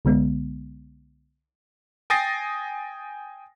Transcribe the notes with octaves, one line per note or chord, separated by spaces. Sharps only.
C2 D3 G#3 B3
G5 G#5 D#6 A6 A#6 C7